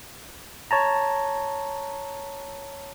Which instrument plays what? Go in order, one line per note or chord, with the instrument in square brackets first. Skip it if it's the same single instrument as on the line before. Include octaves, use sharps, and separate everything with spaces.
[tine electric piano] C#5 A5 A#5